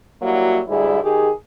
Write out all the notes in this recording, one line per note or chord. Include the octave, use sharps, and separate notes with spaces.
F#3 G3 A#3 E4 F#4
D2 G#2 G3 E4 G#4
D#3 G4 G#4